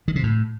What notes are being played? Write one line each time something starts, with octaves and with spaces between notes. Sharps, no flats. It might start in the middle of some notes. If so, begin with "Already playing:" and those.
D#3
C3
A2